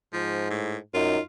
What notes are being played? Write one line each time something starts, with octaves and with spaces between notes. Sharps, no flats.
G#2 F3
A2
F#2 D#4 F4